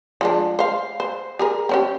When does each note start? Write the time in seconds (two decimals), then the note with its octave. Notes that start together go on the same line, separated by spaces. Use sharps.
0.21 F3 G#3 D4
0.59 C5 F5
1.00 C5
1.39 G4 G#4 A#4
1.69 C4 C#4 G4